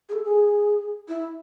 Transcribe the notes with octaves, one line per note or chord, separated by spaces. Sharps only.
G#4
A4
G#4
E4